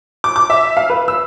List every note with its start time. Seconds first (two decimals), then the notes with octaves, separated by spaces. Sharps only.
0.24 D6
0.36 D6
0.50 E5
0.77 F5
0.90 B4
1.08 E6